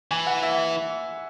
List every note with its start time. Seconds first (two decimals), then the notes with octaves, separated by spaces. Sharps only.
0.11 E3 G#5
0.27 F#5
0.43 E5
0.50 F#5
0.58 E5